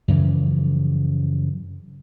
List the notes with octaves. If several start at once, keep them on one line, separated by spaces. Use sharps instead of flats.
F#2 C#3 E3 F3